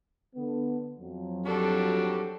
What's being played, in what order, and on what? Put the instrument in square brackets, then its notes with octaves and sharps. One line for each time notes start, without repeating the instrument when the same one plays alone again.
[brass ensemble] D3 B3
F2 F#3
[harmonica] G3 D4 F#4 [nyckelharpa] A4